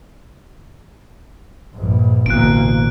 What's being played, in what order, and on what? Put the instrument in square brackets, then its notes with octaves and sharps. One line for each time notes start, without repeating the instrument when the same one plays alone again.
[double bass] A#1 G2
[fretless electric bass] A1 B2 [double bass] D2 A#3 [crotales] F#6 D7